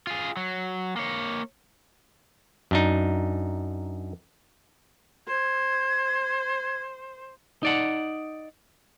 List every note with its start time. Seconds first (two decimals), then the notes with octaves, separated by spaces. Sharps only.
0.07 F4 G#4
0.37 F#3
0.96 A#3 C#5
2.71 F#2 D4 D#4
5.28 C5 G#6
7.63 D#4 D5 F#5